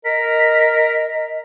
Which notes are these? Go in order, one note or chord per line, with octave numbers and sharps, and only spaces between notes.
A#4 D#5 B6